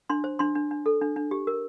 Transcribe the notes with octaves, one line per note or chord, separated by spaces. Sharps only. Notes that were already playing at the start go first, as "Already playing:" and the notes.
D4 C6
C5
D4 C6
D4
D4
A4
D4
D4
G4
A#4